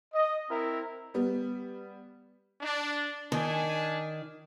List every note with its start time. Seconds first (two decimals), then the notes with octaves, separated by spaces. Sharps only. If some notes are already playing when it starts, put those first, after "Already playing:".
0.13 D#5
0.50 C4 E4 A#4
1.14 G3 B3
2.61 D4
3.32 D#3 D4 G#5